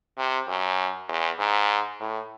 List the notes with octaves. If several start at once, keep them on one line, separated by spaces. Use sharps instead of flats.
C3
F#2
E2
G#2
A2